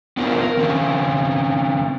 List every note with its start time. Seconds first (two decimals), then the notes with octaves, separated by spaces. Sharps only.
0.17 B3 D4 F4 A#4 C5
0.40 A#4
0.57 D#3 C4 C#4